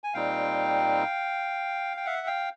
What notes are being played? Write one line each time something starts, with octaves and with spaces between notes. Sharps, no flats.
G#5
A#2 G3 C4 D#4 F5 G5
G5
E5 F#5
F5 G5